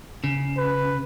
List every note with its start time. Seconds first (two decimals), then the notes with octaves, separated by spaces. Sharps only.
0.24 C#3
0.57 B4